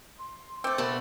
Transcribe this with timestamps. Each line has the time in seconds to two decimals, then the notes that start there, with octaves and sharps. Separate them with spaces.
0.19 C6
0.64 A3 C4 D6
0.78 B2 D4 A#4